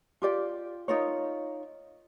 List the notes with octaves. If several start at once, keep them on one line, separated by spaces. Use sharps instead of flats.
F4 G4 D5
D#4 F4 A#4 C#5